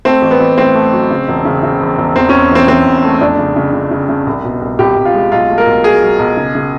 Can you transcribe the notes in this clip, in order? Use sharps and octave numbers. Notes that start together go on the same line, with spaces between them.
A3 C4
A1
B3
A1
A2 C4
A3
F#3
C#3
E1
C#3
C#3
E2
E1
E2 C4
E2 C#4
E3 C4
E3 C4
E2
A3
F2 D4
C#3
C#3
C#3
C#3
C#3
C2
B2
C2
C2 G4
C2
F4
G#3
B1 F4
A3
A#4
B1
F#3 G#4
F#3
B1
C#3
C#3